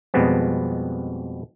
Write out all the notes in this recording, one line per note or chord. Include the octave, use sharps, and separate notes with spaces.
F2 B2 G3 G#3 B3 C4